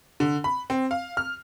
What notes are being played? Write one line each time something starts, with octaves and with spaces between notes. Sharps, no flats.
D3
B5
C4
F5
F6